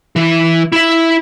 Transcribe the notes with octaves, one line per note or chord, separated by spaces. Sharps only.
E3
E4 E5